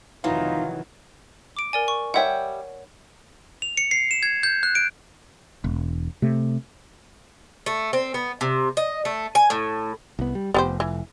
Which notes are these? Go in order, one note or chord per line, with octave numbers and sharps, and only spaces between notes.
F1 D#3 E3 F#3 D#4 F4
D6 D7
A#4 D5 G#5
C#6
G3 C#5 E5 F#5 G5
F7
C#7
C7
E7
G#6
G6
F#6
D7
E1
C3 A3
A3
C4
B3
C3
D#5
A3
G#5
A2
C2 B3
G3
F1 B3 G4 C5
E3